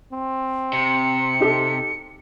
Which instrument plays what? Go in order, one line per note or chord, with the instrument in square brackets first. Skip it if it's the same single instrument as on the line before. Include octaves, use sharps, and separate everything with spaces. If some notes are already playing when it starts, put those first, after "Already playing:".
[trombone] C4
[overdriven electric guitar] C3 [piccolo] C#7
[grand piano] D#4 G4 A4